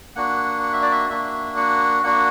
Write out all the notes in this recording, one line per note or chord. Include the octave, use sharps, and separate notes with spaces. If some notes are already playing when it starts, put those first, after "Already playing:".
A#3 D4 F#4 F#5
F#5
E5
D5
E5
A#3 D4 F#4 E5
F#5
A#3 D4 F#4 F#5